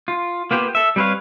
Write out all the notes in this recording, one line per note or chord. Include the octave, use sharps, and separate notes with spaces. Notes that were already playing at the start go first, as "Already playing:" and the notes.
F4
A#3 B3 F4 G4
A4 E5
G3 C4 B4 C#5 F5